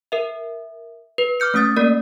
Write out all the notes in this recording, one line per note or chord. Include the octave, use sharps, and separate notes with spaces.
A#4 E5
B4
D6 F6 G6 C#7
A3 C#4 D#6 A6
A#3 C#4 A#4 D5